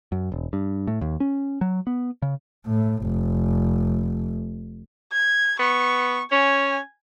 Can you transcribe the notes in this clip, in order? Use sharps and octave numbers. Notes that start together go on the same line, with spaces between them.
F#2
E1
G2
A2
D#2
C#4
F#3
B3
C#3
A2
F1
G#6
B3 C#6
C#4 G#5